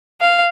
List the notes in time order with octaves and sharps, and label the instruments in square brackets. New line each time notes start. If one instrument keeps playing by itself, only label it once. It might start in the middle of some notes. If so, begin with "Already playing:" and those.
[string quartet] F5